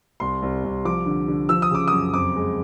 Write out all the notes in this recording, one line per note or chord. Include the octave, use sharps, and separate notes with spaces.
C2 C6
C2
C2
F3 D6
D3
D3
F3 E6
D#6
C#3 D6
F#2 D#6
F2 D6
G#3